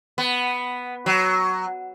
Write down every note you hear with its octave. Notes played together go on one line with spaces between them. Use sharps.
B3
F#3